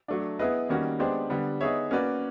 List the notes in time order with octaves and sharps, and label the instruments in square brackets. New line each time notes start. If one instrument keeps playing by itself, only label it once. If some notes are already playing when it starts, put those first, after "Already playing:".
[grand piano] F#3 A3 D4
B3 E4 G#4 B4 D#5
D#3 G3 A#3 C#4 F#4
G#3 B3 D4 G4 C5
D3 G3 B3
B3 D#4 G#4 C#5 E5
A#3 C#4 F#4 B4 D5